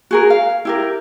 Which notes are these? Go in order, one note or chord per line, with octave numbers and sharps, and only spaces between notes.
F#4 G#4 A#4
F5
E4 G4 A#4